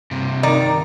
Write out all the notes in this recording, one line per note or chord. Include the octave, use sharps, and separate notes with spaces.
G2 C3
D#3 D#4 D5